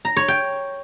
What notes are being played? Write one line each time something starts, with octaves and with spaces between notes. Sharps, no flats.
A#5
C#5
G5